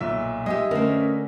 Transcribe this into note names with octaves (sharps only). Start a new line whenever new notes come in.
B1 A#2 E5
G#3 D#4 G4 D#5 E5
D3 A3 C#4 A#4 C5